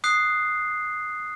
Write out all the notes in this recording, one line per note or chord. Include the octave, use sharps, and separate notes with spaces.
D#6 F#6 C7